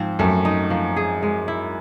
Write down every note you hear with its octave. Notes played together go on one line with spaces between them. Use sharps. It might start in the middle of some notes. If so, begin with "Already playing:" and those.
Already playing: G#2 F3 C4
F#2 A3
D#4
F3
G#4
G#3
E4